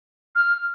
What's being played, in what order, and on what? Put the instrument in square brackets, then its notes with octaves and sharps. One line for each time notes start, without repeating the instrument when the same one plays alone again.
[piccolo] F6